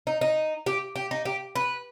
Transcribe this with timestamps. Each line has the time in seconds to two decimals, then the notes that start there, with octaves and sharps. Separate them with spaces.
0.07 D#4
0.21 D#4
0.66 G4
0.96 G4
1.11 D#4
1.25 G4
1.55 B4